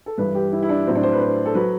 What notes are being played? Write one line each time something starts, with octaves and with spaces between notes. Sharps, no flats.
A4
G2 E3 B4
G4
E4
E4
D4
A2 F#3 C4
D4
C5
B4
C5
A4
F#3 B4